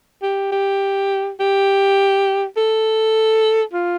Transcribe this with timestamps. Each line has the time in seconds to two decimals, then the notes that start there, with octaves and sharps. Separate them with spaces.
0.22 G4
0.52 G4
1.40 G4
2.57 A4
3.73 F4